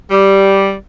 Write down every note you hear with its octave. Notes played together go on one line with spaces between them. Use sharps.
G3